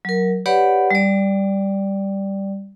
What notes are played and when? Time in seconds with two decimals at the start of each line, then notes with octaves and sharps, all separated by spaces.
0.05 F#3 A#4
0.46 G4 B4 C#5 D5 F#5 B5
0.91 G3 D5